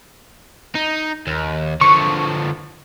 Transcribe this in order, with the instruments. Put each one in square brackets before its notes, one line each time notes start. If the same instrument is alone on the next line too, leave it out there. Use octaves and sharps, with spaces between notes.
[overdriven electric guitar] D#4
D#2
[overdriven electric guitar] D3 F3 [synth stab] C#6